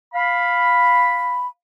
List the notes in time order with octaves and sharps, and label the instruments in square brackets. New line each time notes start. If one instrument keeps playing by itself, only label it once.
[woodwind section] F5 B5